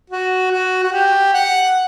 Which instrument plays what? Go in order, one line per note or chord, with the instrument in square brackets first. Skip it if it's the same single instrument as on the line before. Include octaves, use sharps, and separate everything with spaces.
[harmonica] F#4
F#4
F#4
G4
F#5